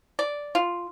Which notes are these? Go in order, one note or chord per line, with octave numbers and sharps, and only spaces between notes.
D5
F4